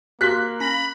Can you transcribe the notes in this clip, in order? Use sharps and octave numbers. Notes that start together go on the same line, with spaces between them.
A#3 F#4 G4 C6 F#6 B6
C#4 B5 A#6